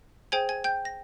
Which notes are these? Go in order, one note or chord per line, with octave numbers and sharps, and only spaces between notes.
G#4 C5 G5 G#5 G#6
G#5 G#6
G5 G6
A#6